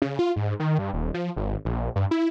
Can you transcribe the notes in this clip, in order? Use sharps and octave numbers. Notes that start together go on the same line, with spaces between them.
C#3
F4
G#2
D#3
G2
D#1
F3
G#1
A#1
G2
E4